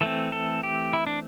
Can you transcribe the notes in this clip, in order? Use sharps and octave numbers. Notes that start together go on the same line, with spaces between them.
E3 A3 C4 A4
A4
G4
E4
D4